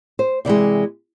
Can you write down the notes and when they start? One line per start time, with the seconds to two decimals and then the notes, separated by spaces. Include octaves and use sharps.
0.19 C5
0.45 C3 E3 G#3 D5